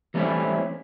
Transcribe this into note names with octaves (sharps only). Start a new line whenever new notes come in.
E3 G3 A3 C4 C#4 E4